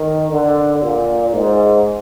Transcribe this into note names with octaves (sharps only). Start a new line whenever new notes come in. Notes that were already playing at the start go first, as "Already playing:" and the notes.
Already playing: D#3
D3
A#2
G#2